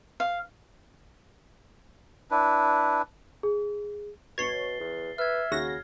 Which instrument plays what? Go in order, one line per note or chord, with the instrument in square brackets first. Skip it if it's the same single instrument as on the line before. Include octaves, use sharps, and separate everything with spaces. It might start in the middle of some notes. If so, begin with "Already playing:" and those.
[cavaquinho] F5
[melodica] D4 E4 B4
[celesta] G#4
[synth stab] G1 C#5 [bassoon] B2 [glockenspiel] A6 C7 G7
[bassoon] E2
[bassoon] B4 [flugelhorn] E5 [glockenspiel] F6 G#6
[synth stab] D#2 F#4 A#6 [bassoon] C#3